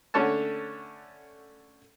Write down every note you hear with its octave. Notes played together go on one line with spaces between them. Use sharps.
D3 A3 C#4 C#5 F#5 A5